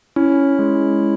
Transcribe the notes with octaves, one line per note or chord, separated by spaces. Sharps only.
C#4 E4
G#3